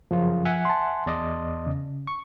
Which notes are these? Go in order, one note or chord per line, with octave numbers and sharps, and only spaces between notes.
F#2 C#3 F3 F4
E5 F#5 G#5
A5 C6
E2 D5 D#5
C#3
C#6